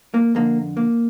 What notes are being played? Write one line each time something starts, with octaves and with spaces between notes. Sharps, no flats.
A#3
F2 D3 A#3
A#3